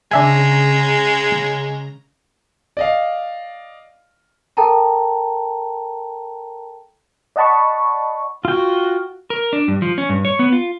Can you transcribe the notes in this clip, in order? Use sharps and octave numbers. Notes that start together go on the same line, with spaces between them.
C#3 G#3 D4 E5 G#5 A#5
D5 D#5 F5
A4 A#4 G5 A5 A#5
D5 D#5 F#5 A5 B5 C#6
F4 F#4 G5
A#4
D4
G2
F3
C#4
G2
C#5
B3
F4